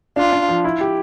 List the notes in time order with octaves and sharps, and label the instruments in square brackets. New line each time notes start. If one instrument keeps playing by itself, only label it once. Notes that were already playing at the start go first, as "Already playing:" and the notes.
[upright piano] D4 [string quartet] F4
[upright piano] D4
F3
E4
G4